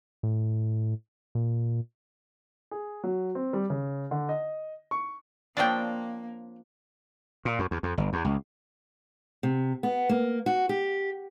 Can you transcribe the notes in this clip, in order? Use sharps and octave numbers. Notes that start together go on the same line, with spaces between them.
A2
A#2
G#4
F#3
C4
G3
C#3
D3
D#5
C#6
F3 A#3 C4 D4 F4 C#5 G5
A#2
F#2
E2
F2
G1
E2
C#2
C3
B3
A#3
F#4
G4